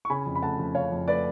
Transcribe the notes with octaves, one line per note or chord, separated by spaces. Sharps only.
C#6
C#3 G#5 B5
F2
B5
A3 F#5 A5
F3
C#3 C#5 F5
F2
A3 B4 D5